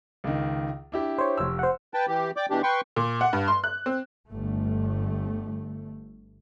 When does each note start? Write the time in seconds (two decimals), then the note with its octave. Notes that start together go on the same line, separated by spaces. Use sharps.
0.24 C#2 D#3
0.92 D4 E4 G4
1.18 C5 C#5
1.37 F1 E6
1.59 C5 F#5
1.94 B4 G5 A5
2.08 E3 G4
2.37 D5 G5 D6
2.50 B2 E3 D4 G4
2.63 B4 G5 C6 C#6
2.96 A#2
3.21 F#5
3.33 G2
3.48 C6
3.64 F#6
3.86 C4
4.27 G1 A3